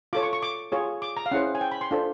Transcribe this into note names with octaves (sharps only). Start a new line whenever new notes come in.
F4 A4 C#5 D6
C#6
C#6
D6
F4 G#4 C#5
D6
A#5
F5
C#4 E4 G#4 C5 F#5
G#5
G5
B5
C6
D4 F4 A4 C5